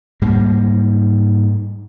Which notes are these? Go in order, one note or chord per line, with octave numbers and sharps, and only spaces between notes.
G#2 G3 A#3